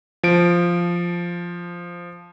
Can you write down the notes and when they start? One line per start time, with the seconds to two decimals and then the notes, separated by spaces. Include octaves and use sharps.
0.23 F3 D7